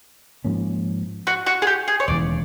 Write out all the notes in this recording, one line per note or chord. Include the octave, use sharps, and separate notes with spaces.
G#2 F3 A#3 C#4
F#4
F#4
G#4
G4
G#4
C#5
E1 D#2 C#3 E3 D5